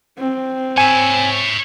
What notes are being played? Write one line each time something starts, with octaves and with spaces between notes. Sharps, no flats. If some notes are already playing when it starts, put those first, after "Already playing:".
C4
C#5 E5 G#5